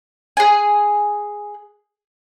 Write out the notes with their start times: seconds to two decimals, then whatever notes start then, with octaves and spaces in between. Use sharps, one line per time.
0.37 G#4 G#5